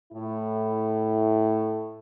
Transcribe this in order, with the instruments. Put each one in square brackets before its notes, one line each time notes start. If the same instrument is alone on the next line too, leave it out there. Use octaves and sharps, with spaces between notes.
[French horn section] A2 E4